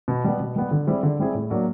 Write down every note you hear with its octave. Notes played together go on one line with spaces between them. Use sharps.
B2
G3 B3
B2
G3 B3
D3
G3 C4 E4 G#4
D3
G3 C4 E4 G#4
A2
F#3 A#3 D4